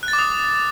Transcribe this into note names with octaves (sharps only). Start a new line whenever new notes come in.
F#6
A6
D6
D#6